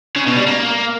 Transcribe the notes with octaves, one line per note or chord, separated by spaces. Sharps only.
C#3
B2
G3
A#3